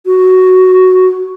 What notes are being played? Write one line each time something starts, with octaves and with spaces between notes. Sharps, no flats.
F#4